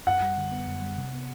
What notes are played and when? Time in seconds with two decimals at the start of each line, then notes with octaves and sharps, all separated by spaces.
0.06 F#2 F#5
0.22 G3
0.37 D3
0.52 B3
0.67 F#2
0.82 G3
0.98 C3
1.13 B3